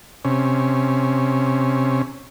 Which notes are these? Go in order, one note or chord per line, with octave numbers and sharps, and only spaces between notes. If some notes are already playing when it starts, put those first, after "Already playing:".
C3 C#4